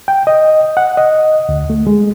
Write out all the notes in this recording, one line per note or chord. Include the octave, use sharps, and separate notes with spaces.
G5
D#5
F#5
D#5
D2
A3
G#3